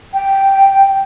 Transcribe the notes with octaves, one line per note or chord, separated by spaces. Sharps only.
G5